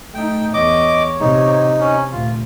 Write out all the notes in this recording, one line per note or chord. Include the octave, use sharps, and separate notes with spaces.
A3 D#4 G5
E2 C#5 D#5 D6
C3 D#4
C#4
D2 A#2 F4